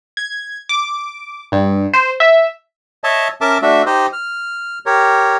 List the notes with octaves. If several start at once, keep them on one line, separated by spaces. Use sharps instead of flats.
G#6
D6
G2
C5
E5
C#5 D#5 E5 A5
C#4 A#4 E5 A5 D6
A3 D4 F#4 E5
D#4 G4 C5 D#5
F6
G4 A#4 C#5